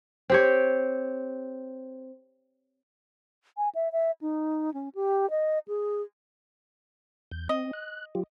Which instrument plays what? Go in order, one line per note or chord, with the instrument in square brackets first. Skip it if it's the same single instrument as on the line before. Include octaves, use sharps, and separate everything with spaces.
[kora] C4 G4 C#5
[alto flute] G#5
E5
E5
D#4
C#4
G4
D#5
G#4
[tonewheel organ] E2 G6
[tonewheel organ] C4 [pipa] D#5
[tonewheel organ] F#6
F#3 F4 G4